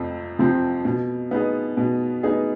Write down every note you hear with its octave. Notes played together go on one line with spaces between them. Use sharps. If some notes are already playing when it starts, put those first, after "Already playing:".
Already playing: F2 C3 F3 C4
C3 F3 C4
B2
B3 D#4 G#4
B2
B3 D#4 G#4